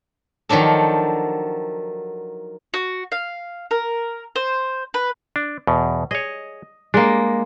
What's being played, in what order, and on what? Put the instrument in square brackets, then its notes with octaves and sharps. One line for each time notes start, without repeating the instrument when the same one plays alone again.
[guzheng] D#3 F3 F#3 D4 A4
[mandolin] F#4
F5
A#4
C5
B4
[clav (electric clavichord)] D4
E2 B2
[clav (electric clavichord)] G#4 C#5 [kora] D#5
[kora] G#3 A#3 [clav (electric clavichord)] D4